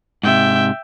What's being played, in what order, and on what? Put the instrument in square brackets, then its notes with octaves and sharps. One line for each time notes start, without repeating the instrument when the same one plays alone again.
[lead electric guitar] G#2 C3 [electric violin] E5 G5